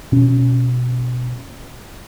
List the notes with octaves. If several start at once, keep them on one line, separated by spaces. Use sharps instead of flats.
B2 C#4